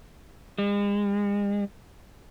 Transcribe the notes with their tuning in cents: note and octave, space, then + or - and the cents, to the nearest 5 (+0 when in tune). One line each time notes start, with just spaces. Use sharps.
G#3 -40